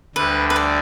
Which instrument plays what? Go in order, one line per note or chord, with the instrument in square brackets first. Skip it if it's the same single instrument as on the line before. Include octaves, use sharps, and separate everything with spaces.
[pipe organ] D2 D3 G3 [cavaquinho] B4
[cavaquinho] B4
D5